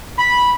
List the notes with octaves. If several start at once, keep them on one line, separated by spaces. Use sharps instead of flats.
B5